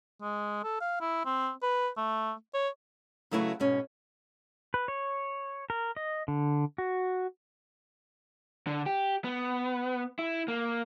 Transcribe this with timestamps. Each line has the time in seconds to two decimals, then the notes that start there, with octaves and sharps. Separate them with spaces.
0.22 G#3
0.64 A4
0.81 F5
1.01 E4
1.25 C4
1.63 B4
1.97 A3
2.54 C#5
3.31 C#3 F#3 A3 E4 F#4 B4
3.60 G#2 B2 C#4
4.74 B4
4.88 C#5
5.70 A#4
5.97 D#5
6.28 D3
6.78 F#4
8.67 D3
8.86 G4
9.24 B3
10.19 E4
10.48 A#3